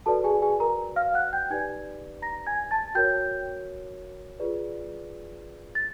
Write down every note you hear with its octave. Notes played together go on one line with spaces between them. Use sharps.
F#4 A4 B4 D5 A5
G#4 G#5
G#4 G#5
A#4 A#5
F5 F6
F#5 F#6
G5 G6
D#4 G4 B4 D5 G#5 G#6
A#5 A#6
G#5 G#6
A5 A6
F#4 A#4 C#5 G5 G6
F4 G#4 B4 D5
A6